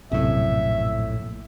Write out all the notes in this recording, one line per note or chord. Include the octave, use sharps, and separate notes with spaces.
A#1 F#2 A2 C3 E5